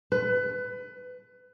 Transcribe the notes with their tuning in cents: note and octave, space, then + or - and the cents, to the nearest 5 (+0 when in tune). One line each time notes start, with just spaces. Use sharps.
B4 +25